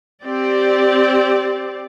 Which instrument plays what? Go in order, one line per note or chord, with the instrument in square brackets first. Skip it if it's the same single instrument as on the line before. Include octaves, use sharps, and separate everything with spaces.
[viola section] C4 G4 D5